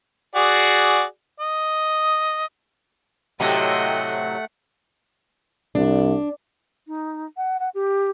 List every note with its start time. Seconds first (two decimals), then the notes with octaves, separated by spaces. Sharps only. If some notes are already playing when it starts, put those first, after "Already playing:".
0.36 F#4 G#4 D5
1.40 D#5
3.40 A2 C3 F#3 A3 D#5 F#5 G5
5.75 C2 D4
6.87 D#4
7.37 F#5
7.60 F#5
7.75 G4